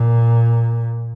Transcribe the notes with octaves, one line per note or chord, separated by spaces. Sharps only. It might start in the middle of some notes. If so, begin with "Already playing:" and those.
Already playing: A#2